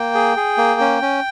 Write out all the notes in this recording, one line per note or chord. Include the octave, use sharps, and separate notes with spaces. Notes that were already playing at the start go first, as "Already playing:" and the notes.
Already playing: A#3 G5
G#4
G#4
A#3
C#4
C#4